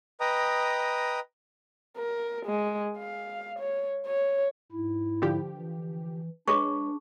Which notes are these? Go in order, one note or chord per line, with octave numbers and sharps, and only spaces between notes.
B4 D#5 G5 A#5 D#6
A#4
G#3
F5
C#5
C#5
G#2 E4
D3 F3 G4
E3
G#3 D4 G#4 B4 C#5 C#6